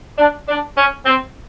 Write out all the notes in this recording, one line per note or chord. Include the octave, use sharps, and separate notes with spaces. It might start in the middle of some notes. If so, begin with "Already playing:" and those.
D4
D4
C#4
C4